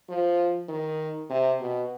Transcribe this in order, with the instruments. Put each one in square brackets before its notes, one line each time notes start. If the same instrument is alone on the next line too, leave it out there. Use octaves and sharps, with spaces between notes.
[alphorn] F3
D#3
C3
B2